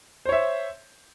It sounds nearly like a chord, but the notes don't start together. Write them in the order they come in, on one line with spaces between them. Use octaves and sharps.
C5 C#5 E5